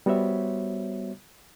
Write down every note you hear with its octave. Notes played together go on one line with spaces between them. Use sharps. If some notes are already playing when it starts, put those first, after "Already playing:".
G3 B3 F#4 C5 C#5 E5